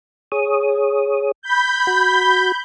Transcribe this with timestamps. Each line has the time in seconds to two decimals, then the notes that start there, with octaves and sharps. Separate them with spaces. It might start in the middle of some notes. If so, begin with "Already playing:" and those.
0.32 G#4 C#5 D#6
1.42 B5 G6
1.87 F#4